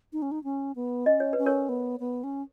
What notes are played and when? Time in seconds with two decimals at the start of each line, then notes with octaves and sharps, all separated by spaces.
0.13 D#4
0.22 C#4
0.31 D#4
0.44 C#4
0.76 B3
1.06 C#4 D#5
1.20 C#5
1.33 B4
1.38 C#4
1.46 A#4 C#5
1.69 B3
2.00 B3
2.24 C#4